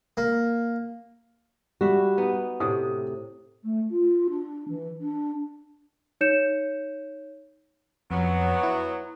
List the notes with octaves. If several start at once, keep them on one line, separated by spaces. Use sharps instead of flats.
A#3
G3 F#4 E5
B3 D#4
A2 C3 D#6
A3
F4
D4
E3
D4
D#4 C#5 G6 C#7 E7
F2 F#3 B3
E4